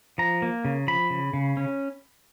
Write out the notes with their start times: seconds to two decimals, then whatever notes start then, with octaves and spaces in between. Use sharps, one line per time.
0.18 F3 A#5
0.42 A#3
0.65 C#3
0.87 F3 B5
1.10 C#3
1.33 C#3
1.57 C#4